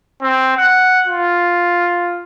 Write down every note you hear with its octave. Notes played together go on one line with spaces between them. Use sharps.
C4
F#5
F4